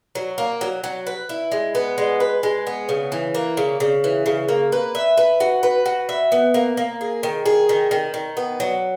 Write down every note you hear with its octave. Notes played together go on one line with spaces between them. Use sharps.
F#3
A#3
F#3
F#3
B4
E4
G#3
B3
G#3
B4
G#3
B3
C#3
E3
A#3
C#3
C#3
E3
C#3
A#3
B4
E5
B4
F#4
B4
F#4
E5
B3
A#3
A#3
G#4
D#3
G#4
D#3
D#3
D#3
B3
F#3